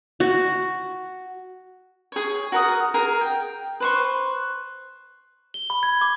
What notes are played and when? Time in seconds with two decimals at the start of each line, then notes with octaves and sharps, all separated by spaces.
0.20 F#4
2.12 G#4 C#5
2.52 F#4 A#4 A#5 D#6
2.94 G#4 A#4 A#5
3.21 G5
3.80 B4 C5 C#6
5.54 G7
5.70 B5
5.83 G#6
6.01 D6